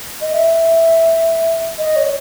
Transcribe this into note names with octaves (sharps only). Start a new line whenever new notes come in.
D#5
E5
D#5
C#5